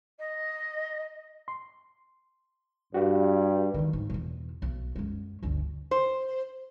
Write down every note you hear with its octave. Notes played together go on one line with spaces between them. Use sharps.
D#5
C6
G2 F#4 G4 F5
D#3 F#3
G#2
E2 B2
B1
F#2 G#3
G1 D2
C5